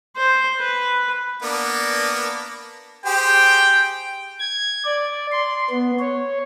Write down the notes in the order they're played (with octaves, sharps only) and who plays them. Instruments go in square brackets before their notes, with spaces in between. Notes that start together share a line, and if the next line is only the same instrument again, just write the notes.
[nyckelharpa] C5
B4
[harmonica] A#3 B3 D4
[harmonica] G4 G#4 C5 [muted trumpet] G5
[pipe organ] G#6
D5
C6
B3
C#5